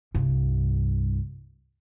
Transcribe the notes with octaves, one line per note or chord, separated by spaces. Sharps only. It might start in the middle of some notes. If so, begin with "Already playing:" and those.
C2 G2